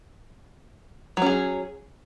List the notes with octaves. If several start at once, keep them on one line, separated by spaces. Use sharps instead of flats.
F#3 C#4 G#4